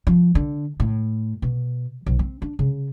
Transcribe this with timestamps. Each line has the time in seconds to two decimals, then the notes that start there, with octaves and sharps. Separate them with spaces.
0.07 F3
0.35 D3
0.80 A2
1.42 B2
2.06 B1
2.19 C4
2.42 D4
2.59 C#3